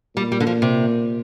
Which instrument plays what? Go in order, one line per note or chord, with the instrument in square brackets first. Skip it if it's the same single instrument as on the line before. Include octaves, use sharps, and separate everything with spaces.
[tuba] A#2 [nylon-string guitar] G3
[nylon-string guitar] G3
D3
F3
C3